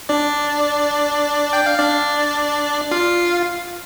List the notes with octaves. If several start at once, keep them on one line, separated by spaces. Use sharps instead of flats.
D4 D5
G5
F5
D4 D5
F4 F5